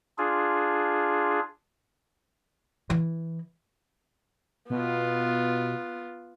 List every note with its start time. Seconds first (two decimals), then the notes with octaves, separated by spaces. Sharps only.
0.18 D4 F4 G#4
2.90 E3
4.70 B2 B3 F4